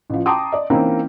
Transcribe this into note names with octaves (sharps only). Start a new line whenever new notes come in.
A1 F3
G5 A5 A#5 C6 D6 D#6
D5 D#5
E3 A#3 C4 C#4 D#4 E4